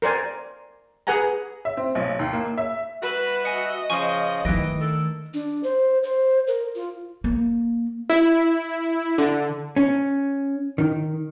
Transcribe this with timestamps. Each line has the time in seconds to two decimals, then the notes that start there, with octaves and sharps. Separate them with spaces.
0.02 A#4 C5 D5 G#5
1.07 G#4 B4 F#5 G#5 A#5
1.65 E5
1.77 C4
1.95 B1
2.19 D#2
2.33 A#3
2.58 E5
3.02 G3 F#4 B4 E5
3.45 D#5 G#5 C#7
3.90 C#3 F3 G#5 C#6
4.45 D#3 E3 A3 A#6 D7
4.80 D3 A4 A#4
5.34 D4
5.64 C5
6.03 C5
6.47 A#4
6.75 F4
7.24 A#3
8.10 E4
9.18 D3
9.76 C#4
10.78 D#3